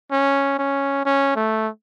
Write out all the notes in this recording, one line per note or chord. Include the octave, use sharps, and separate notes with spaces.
C#4
C#4
C#4
A3